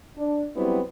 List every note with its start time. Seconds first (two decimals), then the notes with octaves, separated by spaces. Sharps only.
0.17 D4
0.56 F#3 G3 B3 C4 E4